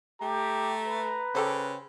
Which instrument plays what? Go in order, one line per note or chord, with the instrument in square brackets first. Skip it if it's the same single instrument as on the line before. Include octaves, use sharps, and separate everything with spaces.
[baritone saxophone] A3 [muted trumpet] G4 [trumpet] A#5
[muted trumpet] B4
[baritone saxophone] C#3 [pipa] G4 A4 C5